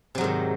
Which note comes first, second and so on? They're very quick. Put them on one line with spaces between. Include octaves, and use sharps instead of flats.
C3 F#3 G#2 D#3